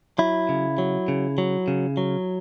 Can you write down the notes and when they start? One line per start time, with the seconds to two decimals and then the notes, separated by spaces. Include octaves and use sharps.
0.18 F#3 E4
0.49 C#3
0.78 F#3
1.08 C#3
1.38 F#3
1.68 C#3
1.97 F#3